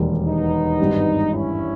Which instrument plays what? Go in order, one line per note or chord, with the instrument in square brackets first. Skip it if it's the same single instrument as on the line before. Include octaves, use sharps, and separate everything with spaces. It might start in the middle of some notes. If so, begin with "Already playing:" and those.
Already playing: [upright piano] E1 D#2 D#3 G3
[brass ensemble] B3 D#4
[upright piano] G#1 G2 G3
[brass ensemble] C#4 E4